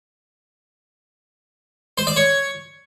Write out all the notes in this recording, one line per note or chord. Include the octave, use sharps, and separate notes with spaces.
C5
D5
C#5